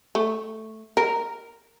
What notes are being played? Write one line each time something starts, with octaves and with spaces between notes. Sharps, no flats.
A3
A#4